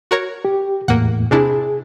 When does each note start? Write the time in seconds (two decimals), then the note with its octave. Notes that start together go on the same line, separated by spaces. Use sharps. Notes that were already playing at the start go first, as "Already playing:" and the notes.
0.11 F#4 A#4 C#5
0.45 G4
0.88 E2 A2 A#3 F#5
1.31 C3 D4 E4 G#4